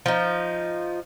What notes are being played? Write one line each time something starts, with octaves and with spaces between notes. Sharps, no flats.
F3 D#4